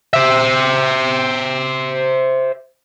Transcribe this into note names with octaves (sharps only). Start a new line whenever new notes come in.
C5 E5